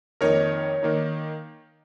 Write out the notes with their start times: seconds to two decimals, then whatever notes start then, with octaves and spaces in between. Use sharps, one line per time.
0.21 F2 D#3 A#3 D#4 A#4 C#5
0.83 D#3 A#3 D#4